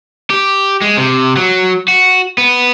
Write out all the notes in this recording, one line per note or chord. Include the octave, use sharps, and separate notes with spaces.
G4
G#3
C3
F#3
F#4
B3